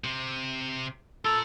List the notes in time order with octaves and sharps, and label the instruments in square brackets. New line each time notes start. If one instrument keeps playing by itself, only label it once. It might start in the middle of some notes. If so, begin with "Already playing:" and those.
[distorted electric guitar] C3
[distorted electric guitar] F4 A#5 [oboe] A4